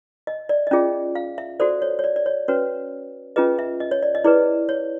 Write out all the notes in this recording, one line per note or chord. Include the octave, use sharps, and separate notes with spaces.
D#5
D5
D#5
C#4 F4 G#4 D5
F5
E5
F#4 A4 C5 D5
C#5
C#5
D5
D5
C#5
C#4 F#4 B4 C#5
C#4 F4 G#4 B4 D#5
E5
D#5
C#5
D5
D#5
E4 G#4 B4 D5
C#5